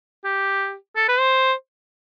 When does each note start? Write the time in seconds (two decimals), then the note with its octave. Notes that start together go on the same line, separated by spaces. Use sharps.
0.24 G4
0.96 A4
1.08 B4
1.19 C5